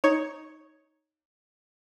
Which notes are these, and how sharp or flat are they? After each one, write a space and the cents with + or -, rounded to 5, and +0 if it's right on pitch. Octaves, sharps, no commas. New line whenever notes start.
D#4 +5 C#5 +0